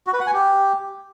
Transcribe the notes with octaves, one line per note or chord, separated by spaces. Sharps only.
F#4
B4
F#5
G#5
G4